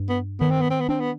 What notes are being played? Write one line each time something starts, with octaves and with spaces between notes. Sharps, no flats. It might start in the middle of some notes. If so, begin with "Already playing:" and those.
Already playing: G2
B3
D#3 B3
C4
B3
C4
B3
C4 D4
B3